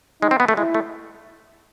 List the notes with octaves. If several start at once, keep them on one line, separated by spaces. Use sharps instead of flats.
G#3 D#4
C4
B3
A3
G#3 E4
A3